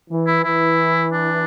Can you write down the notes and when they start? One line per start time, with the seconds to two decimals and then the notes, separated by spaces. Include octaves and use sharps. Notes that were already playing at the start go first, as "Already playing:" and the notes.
0.10 E3
0.27 E4
0.44 E3 E4
1.12 D4